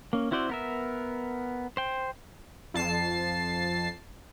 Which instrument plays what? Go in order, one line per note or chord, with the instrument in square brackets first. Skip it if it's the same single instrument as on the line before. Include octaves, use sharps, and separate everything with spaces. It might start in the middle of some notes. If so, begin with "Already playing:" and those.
[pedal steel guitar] A#3 C#4
C4 E4 F#4 C5 D5
B3 A#4 E5
C5 G5
[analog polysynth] F2 A5 C7